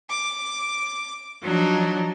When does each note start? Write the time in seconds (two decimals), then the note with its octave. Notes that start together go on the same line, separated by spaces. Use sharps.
0.10 D6
1.42 F3 F#3 D4 D#4